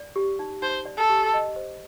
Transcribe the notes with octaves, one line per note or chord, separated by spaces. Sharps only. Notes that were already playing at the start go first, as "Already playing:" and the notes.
Already playing: D5
G4
D#4
D#4 C5
D5
A4
G4
D#5
C5